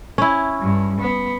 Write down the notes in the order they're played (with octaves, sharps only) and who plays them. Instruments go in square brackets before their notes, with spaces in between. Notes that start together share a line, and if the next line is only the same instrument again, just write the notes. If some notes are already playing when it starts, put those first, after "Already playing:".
[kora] C#4 E4
[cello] G2
B3